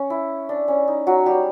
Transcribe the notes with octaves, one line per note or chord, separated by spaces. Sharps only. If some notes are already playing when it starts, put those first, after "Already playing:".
Already playing: C#4
E4
D4
C#4
D#4
F#3 F#4
G3 G4